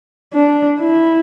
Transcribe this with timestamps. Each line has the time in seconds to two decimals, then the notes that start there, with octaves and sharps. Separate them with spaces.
0.34 D4
0.79 E4